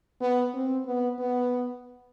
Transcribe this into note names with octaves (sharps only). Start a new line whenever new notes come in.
B3
C4
B3
B3